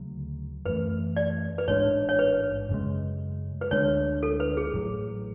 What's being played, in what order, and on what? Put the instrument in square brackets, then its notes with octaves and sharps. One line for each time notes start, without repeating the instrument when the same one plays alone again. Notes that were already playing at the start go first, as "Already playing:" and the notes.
Already playing: [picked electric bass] D2 C#3 F#3
[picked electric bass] F#2 E3 A3 [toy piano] B4
[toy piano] D5
B4
[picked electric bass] A1 G#2 G#3 D4 [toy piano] C#5
[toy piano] C#5
B4
[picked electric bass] F#2 C#3 G#3
[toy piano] B4
[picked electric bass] D2 D3 G#3 D4 [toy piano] C#5
[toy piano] A4
B4
G#4
[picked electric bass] A1 A2 F#3